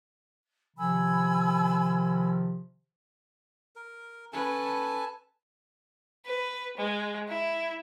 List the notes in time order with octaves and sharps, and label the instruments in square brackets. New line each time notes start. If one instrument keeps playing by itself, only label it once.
[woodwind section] C3 D#3 F3 [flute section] G#5 B5 E6
[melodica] A#4
[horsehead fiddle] C#4 B4 [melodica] A4 G#5 A5
[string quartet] B4
G#3
E4